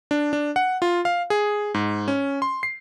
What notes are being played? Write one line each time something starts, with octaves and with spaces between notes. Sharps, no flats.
D4
D4
F#5
F4
F5
G#4
G#2
C#4
C6
C7